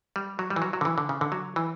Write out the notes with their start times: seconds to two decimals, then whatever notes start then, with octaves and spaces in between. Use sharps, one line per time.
0.16 G3
0.39 F#3
0.50 G3
0.56 E3
0.62 F#3
0.73 F#3
0.81 D3
0.85 E3
0.98 D3
1.09 C#3
1.21 D3
1.32 F#3
1.56 E3